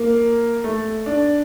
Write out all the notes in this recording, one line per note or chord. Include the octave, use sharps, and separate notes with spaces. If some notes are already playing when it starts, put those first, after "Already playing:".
Already playing: A#3
A3
D4